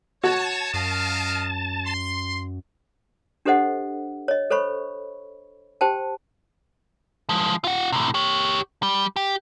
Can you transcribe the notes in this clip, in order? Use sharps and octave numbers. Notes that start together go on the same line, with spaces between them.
F#4 C#5 A5
F#2 A#4 D#5 F5
C6
D4 G4 A4 C5 D#5 F#5
C#5 D#5
A4 C5 C#5 B5 C#6
G4 C5 G5 A5
F3 G#3
F4 F#5
A2 C3
G4 C#5
G3
G4